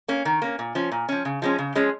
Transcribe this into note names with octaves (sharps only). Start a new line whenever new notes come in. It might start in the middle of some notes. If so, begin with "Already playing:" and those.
A#3 C#4
D#3
A#3 C#4
A#2
F3 C#4
A#2
F3 C#4
C#3
F3 G#3 C#4
C#3
F3 G#3 C#4